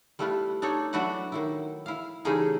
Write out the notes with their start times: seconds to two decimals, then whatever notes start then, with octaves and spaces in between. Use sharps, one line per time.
0.19 G3 A3 E4 F4 B4
0.62 D4 D#4 A4 C#5
0.93 F#3 D4 E4 F#4 B4 F#5
1.32 D#3 F#3 E4
1.86 E4 F5
2.25 C#3 E3 G3 A3 D#4 G#4